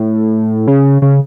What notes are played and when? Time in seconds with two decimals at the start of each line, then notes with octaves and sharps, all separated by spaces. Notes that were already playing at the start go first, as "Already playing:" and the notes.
Already playing: A2
0.68 C#3
1.02 C#3